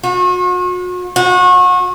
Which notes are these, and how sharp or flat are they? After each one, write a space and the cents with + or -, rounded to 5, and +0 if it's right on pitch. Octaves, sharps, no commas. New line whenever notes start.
F#4 -40
F#4 -30